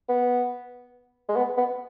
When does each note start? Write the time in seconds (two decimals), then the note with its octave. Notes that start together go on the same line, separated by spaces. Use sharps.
0.09 B3
1.29 G#3
1.36 B3
1.57 B3